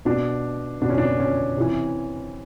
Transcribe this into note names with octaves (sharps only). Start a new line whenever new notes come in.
B2 D4
B2 D4
C#4
D4
C#4
C3 E3